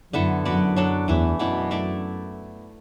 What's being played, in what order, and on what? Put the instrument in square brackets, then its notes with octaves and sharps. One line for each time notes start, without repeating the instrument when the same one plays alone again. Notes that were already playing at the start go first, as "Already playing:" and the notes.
[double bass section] F#2 [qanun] D3 B3 E4 A4
[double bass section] F#2 [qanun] B3 F#4 B4 D5
[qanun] F#3 D4 A4 D5
[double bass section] E2 [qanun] E3 A3 E4
[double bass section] F#2 [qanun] B2 B3 E4 D5
[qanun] A3 E4 D5